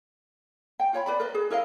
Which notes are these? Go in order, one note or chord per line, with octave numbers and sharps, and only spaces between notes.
G5
F4 C#5 G5 B5
B4 D5 B5
A#4 B4 D#5
G#4
E4 A#4 D#5 F5